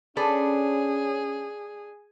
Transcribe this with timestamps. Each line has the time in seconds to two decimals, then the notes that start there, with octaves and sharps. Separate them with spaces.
0.17 C#4 D4 G#4 A4 B4